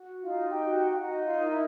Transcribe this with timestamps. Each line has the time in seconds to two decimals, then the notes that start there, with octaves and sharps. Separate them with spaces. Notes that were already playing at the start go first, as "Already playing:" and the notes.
Already playing: F#4
0.23 D#4 F4 F5
0.49 G4 G5
0.62 F#4
0.74 G4 G5
0.92 F5
0.99 D#4 F#4 F#5
1.25 F4 F5
1.38 A#4
1.50 E4 E5